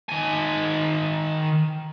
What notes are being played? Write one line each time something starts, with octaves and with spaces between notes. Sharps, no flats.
D#3 G#5